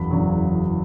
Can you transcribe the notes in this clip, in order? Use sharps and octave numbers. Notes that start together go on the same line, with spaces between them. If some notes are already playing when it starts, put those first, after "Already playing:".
Already playing: F#1 E2 C#3 F#3 B5
F#1 E2 C#3 F#3